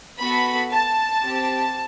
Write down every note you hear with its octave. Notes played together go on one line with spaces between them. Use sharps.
B3 F#4 A4 B5
A5
C4 G4